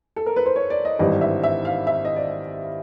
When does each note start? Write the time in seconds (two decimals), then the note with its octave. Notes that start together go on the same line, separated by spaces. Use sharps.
0.16 A4
0.26 A#4
0.36 B4
0.46 C5
0.56 C#5
0.70 D5
0.85 D#5
0.99 G#1 G2 E3 G3 D#5
1.21 E5
1.43 E5
1.65 F5
1.87 E5
2.05 D#5
2.16 D5